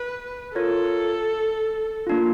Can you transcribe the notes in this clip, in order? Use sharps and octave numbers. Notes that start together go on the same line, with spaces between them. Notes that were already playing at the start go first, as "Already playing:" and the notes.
Already playing: B4
F4 A4 A#4 C#5
A#3 D4 F4